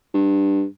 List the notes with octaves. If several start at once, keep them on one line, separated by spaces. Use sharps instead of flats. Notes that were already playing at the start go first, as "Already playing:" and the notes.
G2